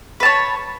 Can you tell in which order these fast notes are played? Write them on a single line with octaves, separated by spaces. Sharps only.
B4 A5 C#5